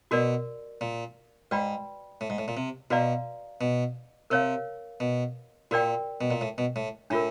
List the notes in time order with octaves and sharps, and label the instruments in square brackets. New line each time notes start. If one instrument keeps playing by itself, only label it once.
[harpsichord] B2 [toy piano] F#4 A#4 D5
[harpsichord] A#2
[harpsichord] G#2 [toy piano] F#4 B4 D5 G5 B5
[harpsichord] A2
G#2
A2
A#2
C3
[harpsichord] B2 [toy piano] F#4 B4 D5 F5 A#5
[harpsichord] B2
[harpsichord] C3 [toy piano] A#4 C#5 F5
[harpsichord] B2
[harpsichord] A#2 [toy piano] F#4 A#4 D5 G5
[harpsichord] B2
A#2
A2
B2
A2
[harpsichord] A2 [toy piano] D4 F4 A#4